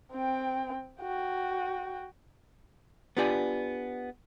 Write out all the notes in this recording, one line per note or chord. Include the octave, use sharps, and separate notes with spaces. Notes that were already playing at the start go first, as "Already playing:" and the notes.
C4 G5
F#4 G5
B3 D4 F4 G4 D5 G#5